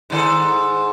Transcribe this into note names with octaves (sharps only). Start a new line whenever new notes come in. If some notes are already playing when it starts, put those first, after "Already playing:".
G#2 D#3 A4